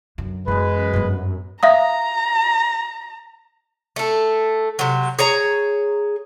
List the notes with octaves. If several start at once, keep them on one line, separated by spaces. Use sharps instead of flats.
F#2 D3
F#2 E3 G#3 B3 B4
G2 B3
E5 F5 A#5 D#6
A3 A4
C3 F#3
G#4 C#5 A#5